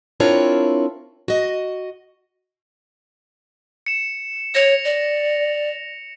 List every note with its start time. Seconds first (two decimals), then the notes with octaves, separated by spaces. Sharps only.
0.20 C4 D4 E4 F4 A#4 C#5
1.28 F#4 D#5
3.86 C#7 E7
4.55 C#5 A#6 C#7 F7
4.85 D5